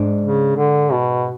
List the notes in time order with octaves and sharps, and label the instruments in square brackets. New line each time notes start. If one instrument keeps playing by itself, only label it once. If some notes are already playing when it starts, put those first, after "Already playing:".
Already playing: [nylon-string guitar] G#2 G#3 D4
[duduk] C#3
D3
B2